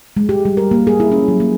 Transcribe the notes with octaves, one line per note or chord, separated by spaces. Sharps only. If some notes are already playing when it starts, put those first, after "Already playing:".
G#3
G4
G3
A#4
A#3
G#4
E4
C#4
F#3
A#3